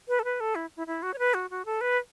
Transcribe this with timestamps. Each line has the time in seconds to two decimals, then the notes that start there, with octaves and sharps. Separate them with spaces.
0.08 B4
0.19 A4
0.24 B4
0.40 A4
0.55 E4
0.77 E4
0.87 E4
1.03 F#4
1.14 C#5
1.19 B4
1.34 F#4
1.50 F#4
1.65 A4
1.81 B4